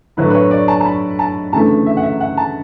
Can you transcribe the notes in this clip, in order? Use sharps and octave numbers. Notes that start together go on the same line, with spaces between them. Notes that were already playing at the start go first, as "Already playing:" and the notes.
A2 F#3 A3 D4 B4
B4
C#5
D5
A5
A5
B5
A5
D2 C#3 E3 A3 A5
E5
F#5
E5
F#5
A5